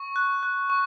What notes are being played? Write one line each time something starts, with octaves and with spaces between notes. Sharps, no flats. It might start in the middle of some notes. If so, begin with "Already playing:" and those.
Already playing: C#6
F#6
F#6
C#6